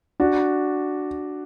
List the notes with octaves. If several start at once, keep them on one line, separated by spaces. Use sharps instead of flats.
D4 F#4